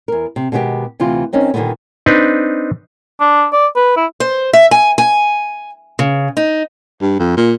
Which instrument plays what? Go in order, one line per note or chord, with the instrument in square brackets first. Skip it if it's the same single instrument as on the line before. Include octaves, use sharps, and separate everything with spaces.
[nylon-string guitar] E2 A#4
C3
B2 D#3 G#3 B3 F#4 G4
D2 C3 E3 F4
D#3 C4 C#4 D#4
A#2 D3 D#3 G3 A3 B3
[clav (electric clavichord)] C4 D4 D#4 B4
[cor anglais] D4
D5
B4
E4
[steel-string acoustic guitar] C5
E5
G#5
G#5
C#3
D#4
[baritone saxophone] G2
F2
A#2